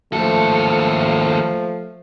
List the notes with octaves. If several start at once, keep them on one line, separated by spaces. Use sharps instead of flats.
D#2 F3 A3 A4